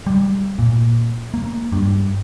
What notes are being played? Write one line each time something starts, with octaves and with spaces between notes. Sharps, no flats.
G3
A#2
A#3
G2